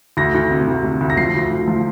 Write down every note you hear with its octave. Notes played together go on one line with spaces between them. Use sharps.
D2 A#6
D2
C3
D2
C3
D2
A#6
F3 C7
D2
D2
F3